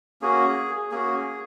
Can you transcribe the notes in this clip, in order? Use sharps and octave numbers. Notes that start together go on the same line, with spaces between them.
A#3 C#4 F#4 G#4
A#3 C#4 F#4 G#4